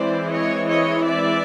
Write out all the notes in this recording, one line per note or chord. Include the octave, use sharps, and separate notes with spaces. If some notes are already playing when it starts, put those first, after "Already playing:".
Already playing: E3 G#3 C4 E4 C5 D5
C#5 D#5
C#5 D#5
D5 E5